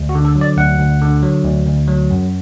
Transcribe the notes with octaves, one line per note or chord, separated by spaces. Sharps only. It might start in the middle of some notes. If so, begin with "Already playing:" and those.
Already playing: D2
F#4
D3
A4
F#3
D5
D2 F#5
D2
D3
F#3
D2
D2
F#3
F#2